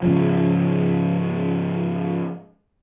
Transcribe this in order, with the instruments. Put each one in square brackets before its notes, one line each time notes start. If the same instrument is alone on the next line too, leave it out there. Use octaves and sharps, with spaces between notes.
[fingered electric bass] G#2 C#3 F3